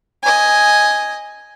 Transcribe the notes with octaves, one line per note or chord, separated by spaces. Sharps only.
D#5 G#5